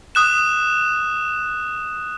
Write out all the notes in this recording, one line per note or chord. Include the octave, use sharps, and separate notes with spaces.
D#6 F#6 E7